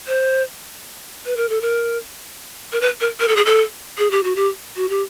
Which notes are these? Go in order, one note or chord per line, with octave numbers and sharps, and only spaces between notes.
C5
B4
A#4
A4
A#4
A#4
B4
A#4
A#4
A4
G#4
A4
G#4
G4
F#4
G4
F#4
G4